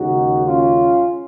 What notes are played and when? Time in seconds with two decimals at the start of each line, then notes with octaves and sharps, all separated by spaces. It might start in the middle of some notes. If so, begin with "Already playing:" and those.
Already playing: D#2 C#3 G#3 D#4 F#4
0.45 C#4 F4